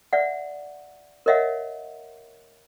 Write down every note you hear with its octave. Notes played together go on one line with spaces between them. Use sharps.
D5 E5 F#5
A#4 C#5 D#5 E5 F#5